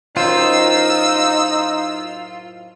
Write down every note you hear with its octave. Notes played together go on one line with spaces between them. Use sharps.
F#2 A2 D#4 F4 C5 E6